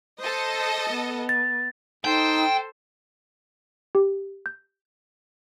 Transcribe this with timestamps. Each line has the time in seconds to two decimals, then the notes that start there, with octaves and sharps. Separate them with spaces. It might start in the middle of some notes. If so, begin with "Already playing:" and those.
0.21 A4 C5 D#5
0.90 B3
1.29 A6
2.05 D#4 A4 C5 G5
3.95 G4
4.46 G6